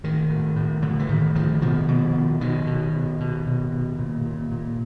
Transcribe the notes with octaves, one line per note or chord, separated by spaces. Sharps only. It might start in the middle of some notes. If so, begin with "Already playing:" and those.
A2 D#3
A2
A2
A2 D3
E3
A2 D#3
A2 D#3 F3
B2 D#3 F3
B2
B2
B2 D#3
B2
B2
B2
B2
B2
A#2
A#2
A#2